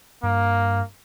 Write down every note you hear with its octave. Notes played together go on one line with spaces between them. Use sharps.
G2 A#3